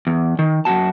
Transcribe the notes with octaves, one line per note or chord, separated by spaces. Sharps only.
E2
D#3
F#2 A#2 F#4 A5